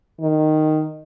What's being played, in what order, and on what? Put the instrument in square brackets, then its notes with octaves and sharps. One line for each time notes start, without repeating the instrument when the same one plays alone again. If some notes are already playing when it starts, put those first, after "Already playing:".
[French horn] D#3